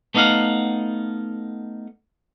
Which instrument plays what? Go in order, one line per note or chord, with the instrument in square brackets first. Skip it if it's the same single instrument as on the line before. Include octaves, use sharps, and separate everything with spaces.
[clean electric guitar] A3 B3 D#4 D#5 F5 F#5